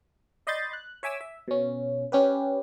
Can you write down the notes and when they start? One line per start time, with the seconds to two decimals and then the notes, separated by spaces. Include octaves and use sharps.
0.47 D5 D#5 B5 C6 G6 A6
0.73 F#6
1.03 C#5 E5 G#5 D6 E6
1.21 E5
1.48 B2 C#4
2.12 C#4 G4 B4